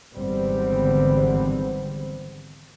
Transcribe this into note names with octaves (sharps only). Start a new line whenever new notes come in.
G#1 E2 D3 G3 B3 C4